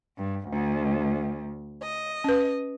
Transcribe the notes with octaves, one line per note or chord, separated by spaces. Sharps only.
G2
D2
D#5
C#4 B4